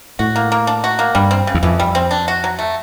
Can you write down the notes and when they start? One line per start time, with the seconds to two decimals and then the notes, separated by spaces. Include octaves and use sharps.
0.19 A2 F#4
0.36 A#3
0.52 A#3
0.67 D4
0.84 F#4
0.99 A#3
1.15 G2 G3
1.31 C4
1.47 C#3
1.55 E2
1.63 F2 E3
1.80 G3
1.95 C4
2.11 D4
2.28 F#4
2.44 F#3
2.59 A3